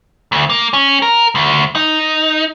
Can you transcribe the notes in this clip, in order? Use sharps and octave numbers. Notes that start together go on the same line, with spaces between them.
D2
A#3
C#4
A#4
D2
D#4